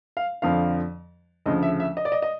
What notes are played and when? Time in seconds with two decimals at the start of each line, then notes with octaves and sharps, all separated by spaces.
0.17 F5
0.42 F2 D3 F3 F5
1.46 D2 C#3 F3 D#5
1.62 E5
1.80 E5
1.97 D#5
2.05 D5
2.12 D#5
2.22 D#5